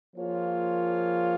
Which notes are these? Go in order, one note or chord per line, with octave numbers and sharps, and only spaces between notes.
F3 A#3 F4 G#4 C#5